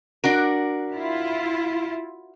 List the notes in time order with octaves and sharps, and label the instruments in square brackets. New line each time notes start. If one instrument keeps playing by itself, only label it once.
[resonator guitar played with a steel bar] D4 F#4 A#4
[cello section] E4 F4